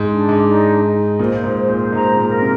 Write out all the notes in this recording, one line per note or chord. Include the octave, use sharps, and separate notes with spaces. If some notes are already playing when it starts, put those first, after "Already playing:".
Already playing: G#2
D4
G#2
D#4
D#4
A#2 C5
G#2
C5
A#2
G#2 A#5
A#2
A#4
C3